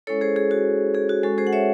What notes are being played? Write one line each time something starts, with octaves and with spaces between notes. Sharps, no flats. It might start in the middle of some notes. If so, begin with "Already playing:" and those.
G#3 C#4 E4 A4 C#5
G#4 C5
G#4
F#4
G#4
F#4
G#3 C#4 F#4 A4
G#4 C5
F#5
C#5 E5